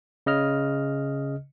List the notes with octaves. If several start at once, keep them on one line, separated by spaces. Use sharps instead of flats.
C#3 D#5 F6